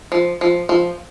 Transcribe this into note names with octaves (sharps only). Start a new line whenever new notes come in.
F3
F3
F3